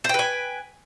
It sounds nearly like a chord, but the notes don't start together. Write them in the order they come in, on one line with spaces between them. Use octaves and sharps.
C5 G5 B4 G#5